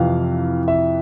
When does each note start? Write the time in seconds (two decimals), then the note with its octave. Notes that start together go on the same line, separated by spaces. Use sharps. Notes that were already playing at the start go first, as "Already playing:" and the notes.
Already playing: F2 C3 E3 F5
0.68 E5